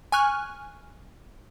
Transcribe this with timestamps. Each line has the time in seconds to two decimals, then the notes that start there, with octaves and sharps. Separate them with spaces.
0.12 G#5 C#6 F6 F#6